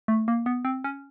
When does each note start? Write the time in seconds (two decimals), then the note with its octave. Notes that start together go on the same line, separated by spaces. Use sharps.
0.08 A3
0.28 A#3
0.46 B3
0.65 C4
0.84 C#4